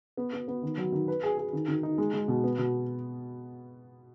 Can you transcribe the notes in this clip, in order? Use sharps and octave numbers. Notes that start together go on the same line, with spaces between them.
B3
B3
B3
D#3
F#3
D#3
B4
G#4
G#4
D#3
D#3
D#4
G#3
G#3
B2
B3
B2